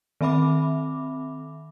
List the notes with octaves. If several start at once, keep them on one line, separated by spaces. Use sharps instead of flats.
D#3 C4 E5 B5 D6